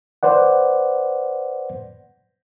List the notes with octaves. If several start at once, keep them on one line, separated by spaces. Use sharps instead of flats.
B4 C5 D5 F#5